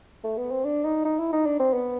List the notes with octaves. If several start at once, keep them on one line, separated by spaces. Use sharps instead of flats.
A3
B3
C4
D4
D#4
D#4
E4
D#4
D4
C4
B3